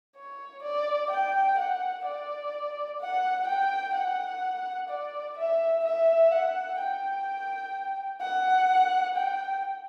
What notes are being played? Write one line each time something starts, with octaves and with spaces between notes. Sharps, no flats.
C#5
D5
G5
F#5
D5
F#5
G5
F#5
D5
E5
E5
F#5
G5
F#5
G5